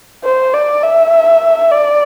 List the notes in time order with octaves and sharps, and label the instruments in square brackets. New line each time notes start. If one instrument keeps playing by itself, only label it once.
[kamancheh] C5
D5
E5
D5